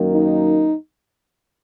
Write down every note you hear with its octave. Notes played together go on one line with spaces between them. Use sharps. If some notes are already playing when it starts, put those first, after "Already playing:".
Already playing: F#2 D#3 A#3
D#4